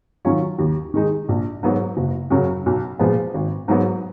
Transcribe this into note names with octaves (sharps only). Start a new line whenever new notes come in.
D#3 F#3 C#4 F4
D#2
D#3 G#3 D#4
A#1
G#2 F#3 B3
F#1
F#2 C#3 F#3
B1
A#2 F3 G#3 B3
G#1
G#2 F#3 B3